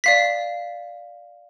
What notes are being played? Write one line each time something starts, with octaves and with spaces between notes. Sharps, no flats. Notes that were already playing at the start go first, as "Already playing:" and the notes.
D5 F5 B6